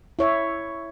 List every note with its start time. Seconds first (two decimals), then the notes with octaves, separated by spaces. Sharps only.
0.19 E4 C#5 E5